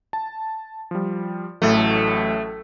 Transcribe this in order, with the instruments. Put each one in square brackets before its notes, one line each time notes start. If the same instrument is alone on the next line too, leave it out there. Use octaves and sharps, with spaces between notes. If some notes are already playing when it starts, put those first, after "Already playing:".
[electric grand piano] A5
F3 G3
[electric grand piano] A1 A2 F#3 [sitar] A3